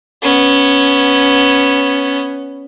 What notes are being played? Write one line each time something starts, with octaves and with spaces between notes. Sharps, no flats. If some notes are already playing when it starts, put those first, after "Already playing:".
B3 C#4